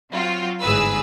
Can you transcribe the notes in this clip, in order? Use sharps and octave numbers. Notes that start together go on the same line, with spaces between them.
F#3 C4 F4 F#4
G1 G#2 E3 G#4 B4 E6